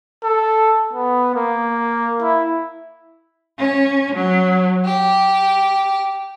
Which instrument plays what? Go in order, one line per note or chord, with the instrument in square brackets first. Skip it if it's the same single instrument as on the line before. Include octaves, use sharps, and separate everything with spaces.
[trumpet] A4
B3
A#3
E4
[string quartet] C#4
F#3
G4